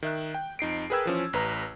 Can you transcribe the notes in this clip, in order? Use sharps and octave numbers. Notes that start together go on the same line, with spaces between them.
D#3 E5 F#6
G5
F2 D#4 C7 D7
G#4 A#4 B4 G5 E6 G#6
E3 F3 C#4
A1 B4 A#5